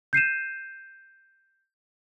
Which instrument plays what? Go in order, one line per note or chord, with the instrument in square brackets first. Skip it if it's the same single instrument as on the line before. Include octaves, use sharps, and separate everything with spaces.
[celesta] G6 C7 D#7 E7